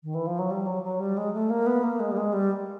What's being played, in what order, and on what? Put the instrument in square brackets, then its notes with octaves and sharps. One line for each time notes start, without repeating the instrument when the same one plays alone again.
[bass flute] D#3
E3
F3
F#3
G3
F#3
F#3
G3
G#3
A3
A#3
B3
A#3
G#3
G3
G#3
G3